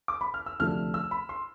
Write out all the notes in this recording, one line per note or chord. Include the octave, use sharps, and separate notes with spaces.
D6
B5
F6
E6
D2 C3 F3 A3 D4 F6
E6
B5
C6